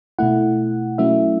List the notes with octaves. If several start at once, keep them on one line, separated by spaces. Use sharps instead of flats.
B2 A3 E4 F#5
F#3 A3 C#4 E4 E5